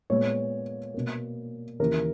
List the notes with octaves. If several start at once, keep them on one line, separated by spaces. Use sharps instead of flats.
A#2 G#3 B3 C#5
B2 A#3
D#2 C#3 E3 A#4